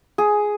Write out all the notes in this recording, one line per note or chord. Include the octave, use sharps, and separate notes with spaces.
G#4